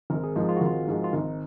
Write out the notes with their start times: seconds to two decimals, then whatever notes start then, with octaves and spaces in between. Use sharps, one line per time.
0.10 G#1 A#4
0.24 G#4
0.35 G#2 F3 G#3 F4
0.49 F4
0.57 F#4
0.61 G#1 F4
0.87 G#2 F3 G#3
1.04 F4
1.13 G#1 D#4